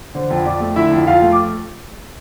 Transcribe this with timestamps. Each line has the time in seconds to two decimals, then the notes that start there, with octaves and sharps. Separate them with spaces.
0.15 D3 C5
0.30 F2
0.45 F2 D5
0.60 A3
0.76 D3 E4 E5
0.91 F2
1.07 F2 F4 F5
1.22 A3
1.32 D6